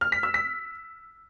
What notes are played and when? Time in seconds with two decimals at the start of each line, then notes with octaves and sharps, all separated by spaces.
0.01 F6
0.12 B6
0.23 E6
0.34 B6